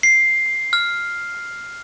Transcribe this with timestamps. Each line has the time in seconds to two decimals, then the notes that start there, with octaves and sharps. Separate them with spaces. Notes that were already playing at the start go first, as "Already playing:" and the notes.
0.03 C7
0.73 F6